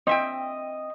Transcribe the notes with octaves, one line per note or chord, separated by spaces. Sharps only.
C4 D#5 E5 G5